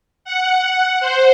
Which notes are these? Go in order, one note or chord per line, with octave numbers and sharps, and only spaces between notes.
F#5
C5